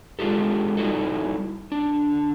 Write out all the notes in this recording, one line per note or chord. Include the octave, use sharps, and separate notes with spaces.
G#3 D4 F4 G4 A4
G3 D#4 E4 F#4 A4
D3 D4